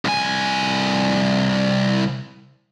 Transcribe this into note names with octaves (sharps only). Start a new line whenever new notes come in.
C2 G#5